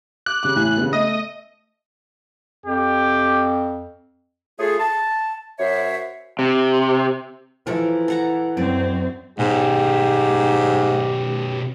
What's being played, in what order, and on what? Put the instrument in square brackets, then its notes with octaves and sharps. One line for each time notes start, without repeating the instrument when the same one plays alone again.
[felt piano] D6 [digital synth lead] F#6
[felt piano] C#3 G3 D6
A1 E3 G#5
C#3 B3
[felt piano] A3 E5 [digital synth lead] D#5
[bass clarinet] F2 [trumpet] G4
[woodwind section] A3 F4 G#4
A5
F#2 C5 C#5 E5
[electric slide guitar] C3
[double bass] E3 [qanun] F3 A4 A#4
[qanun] A4 F#5 A#5
[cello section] F#2 C4 [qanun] D5
[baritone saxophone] G#2 [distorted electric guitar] B2 C#4 [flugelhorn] G4